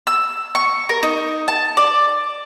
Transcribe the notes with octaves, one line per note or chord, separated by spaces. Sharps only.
E6
C#6
A#4
D#4
A5
D5